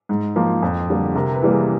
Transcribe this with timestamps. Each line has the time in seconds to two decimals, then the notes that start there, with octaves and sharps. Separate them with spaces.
0.09 G#2
0.36 F3 A#3
0.62 F2
0.89 D3 G3 A#3
1.15 C3 A#4
1.34 B4
1.42 E3 G3 A#3
1.51 G#4